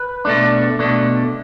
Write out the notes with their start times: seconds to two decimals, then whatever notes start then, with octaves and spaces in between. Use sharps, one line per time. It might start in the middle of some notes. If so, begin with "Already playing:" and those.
Already playing: B4
0.25 B2 A3 D4
0.79 B2 A3 D4